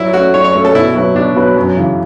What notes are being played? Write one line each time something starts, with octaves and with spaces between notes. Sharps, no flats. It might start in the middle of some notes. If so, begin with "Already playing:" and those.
Already playing: F#3 E4
A3 C#4 F#4
F#3 C#5
C#5
A3 C#4
A4
B2 E4
F#3 B3 F#4 B4
B2 D4
F#3 B3 F#4 B4
F#2
C#3 E3